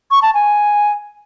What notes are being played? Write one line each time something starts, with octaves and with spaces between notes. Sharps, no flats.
C#6
A5
G#5